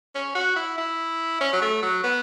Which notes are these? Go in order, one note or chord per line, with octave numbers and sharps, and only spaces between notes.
C#4
F#4
E4
E4
C#4
F#3
A3
F#3
B3